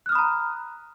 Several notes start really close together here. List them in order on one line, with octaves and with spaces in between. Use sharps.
F#6 F6 D#6 B5 A#5